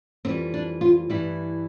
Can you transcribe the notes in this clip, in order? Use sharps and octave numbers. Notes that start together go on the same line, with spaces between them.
F2 E3 G3 C4
D4
F4
G2 E3 G3 E4